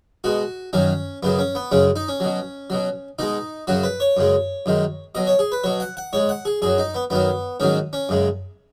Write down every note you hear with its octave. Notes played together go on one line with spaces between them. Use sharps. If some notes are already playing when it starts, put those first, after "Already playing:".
B2 G#3 F#4
F#2 D#3 F#3 C#4
F#2 C#3 F#3 B3
C#4
B3
F#2 C#3 G#3 C#4
D#4
C#4
B2 F#3
B2 F#3
B2 G#3 D#4
F#2 C#3 F#3 F#4
B4
C#5
F#2 C#3 G#3
F#2 D#3 G#3
B2 F#3 D#5
C#5
G#4
B4
B2 F#3 C#5
F#5
F#5
G#2 G#3 C#5
F#5
G#4
F#2 F#3 G#4
D#4
B3
F#2 D#3 F#3 B3
G#2 D#3 F#3 C#4
C#4
F#2 C#3 G#3